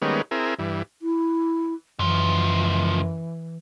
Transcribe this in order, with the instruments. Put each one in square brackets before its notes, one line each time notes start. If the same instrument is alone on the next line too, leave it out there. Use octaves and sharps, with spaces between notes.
[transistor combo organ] D#3 G3 G#3 A#3 B3 C#4
C4 E4 G#4 A#4
G2 E3
[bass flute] E4
[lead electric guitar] C#2 F3 [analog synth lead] F#2 [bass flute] E3